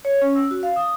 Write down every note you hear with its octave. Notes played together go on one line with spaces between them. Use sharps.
C#5
C#4
E6
F#4
F5
D#6